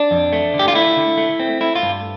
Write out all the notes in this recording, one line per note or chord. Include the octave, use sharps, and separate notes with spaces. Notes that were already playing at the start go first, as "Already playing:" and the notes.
Already playing: D4
F2
A3
D3
G4
F4
A3 E4
D3
A3
C4
A3 E4
F4
G2